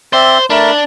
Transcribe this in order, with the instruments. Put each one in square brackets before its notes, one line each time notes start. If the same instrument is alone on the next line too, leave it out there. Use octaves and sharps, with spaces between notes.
[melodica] C4 D5 E5 [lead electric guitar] C5
[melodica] A3 A#4 B5 [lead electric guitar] D4